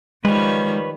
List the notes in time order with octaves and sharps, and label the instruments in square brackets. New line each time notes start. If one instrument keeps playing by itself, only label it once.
[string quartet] D#3 F3 G3 [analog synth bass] G#3 [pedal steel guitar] B4 C#5